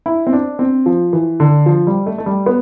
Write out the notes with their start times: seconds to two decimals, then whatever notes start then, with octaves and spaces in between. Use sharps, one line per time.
0.06 E4
0.27 C4
0.33 D4
0.59 C4
0.86 F3
1.13 E3
1.40 D3
1.66 F3
1.87 G3
2.06 A3
2.18 A3
2.26 G3
2.46 B3